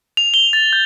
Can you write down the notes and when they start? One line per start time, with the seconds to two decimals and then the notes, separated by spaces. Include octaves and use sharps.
0.17 F7
0.34 G7
0.53 A6
0.73 G6